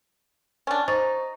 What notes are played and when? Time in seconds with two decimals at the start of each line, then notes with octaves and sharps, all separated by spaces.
0.67 C#4 D4
0.88 D#4 C5 C#6 A6